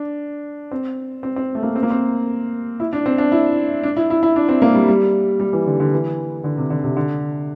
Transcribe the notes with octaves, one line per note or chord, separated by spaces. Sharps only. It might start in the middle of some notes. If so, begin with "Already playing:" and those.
Already playing: D4
C4
C4
C4
A3
A#3
C4
A#3
C4
E4
D4
C4
D4
E4
D4
E4
E4
E4
D4
C4
A#3
G3
G3
G3
E3
D3
D3
E3
D3
C3
D3
C3
D3